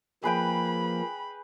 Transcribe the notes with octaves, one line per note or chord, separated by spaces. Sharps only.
F3 A#3 G#4 B4 G5 B5